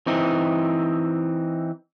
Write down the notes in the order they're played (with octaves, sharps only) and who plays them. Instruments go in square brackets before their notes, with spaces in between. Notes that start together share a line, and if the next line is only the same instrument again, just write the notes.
[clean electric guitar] E3 C4 D#4